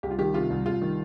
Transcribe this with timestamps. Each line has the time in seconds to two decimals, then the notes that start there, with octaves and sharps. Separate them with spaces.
0.03 C2 G4
0.11 F4
0.18 D#3 G4
0.34 C3 F4
0.50 C2
0.66 C2 F4
0.82 D#3